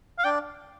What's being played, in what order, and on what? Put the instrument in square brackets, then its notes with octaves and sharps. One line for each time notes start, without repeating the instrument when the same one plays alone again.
[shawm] F5
[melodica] D4 D5 [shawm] G5